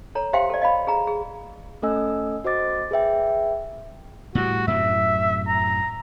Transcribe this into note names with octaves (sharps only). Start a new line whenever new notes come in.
A4 C#5 A#5
G4 C5 E5 F5 G5 C6
A4 D5
D#5 F5 B5
G#4 A#5
G#4
A3 C#4 A4 D#5 G#5 E6
F#4 C5 D#5 D6 A6
G#4 B4 E5 G5
A2 G3 F#4
F#2 A2 C3 E5
A#5